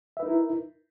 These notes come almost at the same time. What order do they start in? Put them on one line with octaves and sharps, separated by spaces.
E5 B4 D#4 A#4 E4